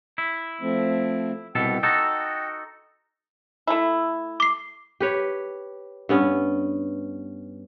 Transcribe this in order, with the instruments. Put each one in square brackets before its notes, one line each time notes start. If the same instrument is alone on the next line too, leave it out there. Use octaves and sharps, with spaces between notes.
[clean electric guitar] E4
[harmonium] F3 A3 C4
[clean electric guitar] C2 B2 A4 [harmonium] G5
[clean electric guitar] D#4 F#4 A4
[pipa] A3 E4
[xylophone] D6 C7
[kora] G4 B4 C#5
G2 B3 C#4